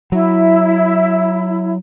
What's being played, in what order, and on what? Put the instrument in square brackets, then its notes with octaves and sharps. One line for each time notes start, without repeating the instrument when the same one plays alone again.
[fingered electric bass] F#3 [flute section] E4